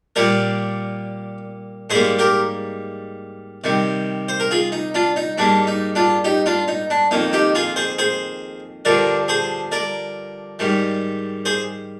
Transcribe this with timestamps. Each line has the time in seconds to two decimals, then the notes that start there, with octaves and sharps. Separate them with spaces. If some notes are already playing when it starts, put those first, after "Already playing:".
0.16 A#2 G3 A#3 A#4 D5
1.90 G#2 G3 A#3 G#4 C5
2.19 G4 A#4
3.64 C3 D#3 G3
4.29 C5
4.40 A#4
4.51 F4 G#4
4.72 D#4
4.95 D4 F4
5.16 D#4
5.38 G#2 G3 A#3 D4
5.67 D#4
5.95 D4 F4
6.24 D#4 G4
6.46 D4 F4
6.68 D#4
6.90 D4
7.11 F2 D#3 A#3 D#4
7.33 D#4 G4
7.55 F4 G#4
7.76 G#4 C5
7.98 G#4 C5
8.85 G2 D3 F3 A#4 D5
9.28 G#4 C5
9.72 A#4 D5
10.59 G#2 D#3 G3
11.45 G#4 C5